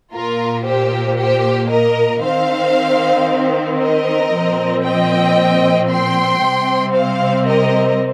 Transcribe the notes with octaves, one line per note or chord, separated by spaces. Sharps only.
A#2 A#3 F4 A#4
G4 C5
G4 C5
A#4 D#5
D#3 C4 C5 F5
A#4 D#5
A#2 F3 C4
D#5 G5
G5 C6
C3 G3 C4
C5 F5
A#4 D#5